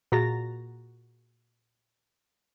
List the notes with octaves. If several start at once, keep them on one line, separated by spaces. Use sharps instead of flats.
A#2 F#4 G#4 A#5 A6 A#6